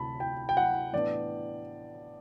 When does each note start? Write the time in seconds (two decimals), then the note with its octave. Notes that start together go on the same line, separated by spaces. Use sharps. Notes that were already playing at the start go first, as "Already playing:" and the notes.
Already playing: D2 C3 F#3 A5 B5
0.20 G5
0.49 G5
0.57 F#5
0.93 A2 E3 B3 D4 D5